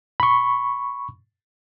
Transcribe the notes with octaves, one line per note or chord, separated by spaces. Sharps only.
B5 C#6